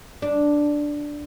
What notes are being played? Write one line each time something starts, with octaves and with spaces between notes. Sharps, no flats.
D4